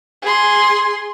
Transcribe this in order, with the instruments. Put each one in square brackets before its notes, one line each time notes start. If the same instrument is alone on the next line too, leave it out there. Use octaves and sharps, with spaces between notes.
[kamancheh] G#4 C6